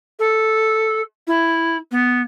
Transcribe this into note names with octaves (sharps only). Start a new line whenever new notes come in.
A4
E4
B3